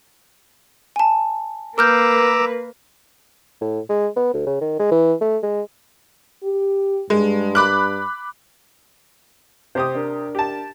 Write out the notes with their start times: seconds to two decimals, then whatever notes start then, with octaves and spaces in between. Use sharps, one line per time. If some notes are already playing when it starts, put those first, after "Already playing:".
0.96 G#5 A5
1.78 A#3 A#4 B4 A#5 D6 E6 F6 G6
3.61 A2
3.89 G#3
4.16 B3
4.34 D2
4.46 C#3
4.61 D#3
4.79 G#3
4.91 E3
5.21 A3
5.43 G#3
6.43 G4
7.10 G2 G#3
7.55 B5 D6 F#6
9.75 C3 G4 C5 D#6
9.95 D4 A#4
10.35 G4 A5